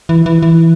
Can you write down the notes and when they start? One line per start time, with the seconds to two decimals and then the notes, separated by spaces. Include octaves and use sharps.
0.09 E3
0.26 E3
0.43 E3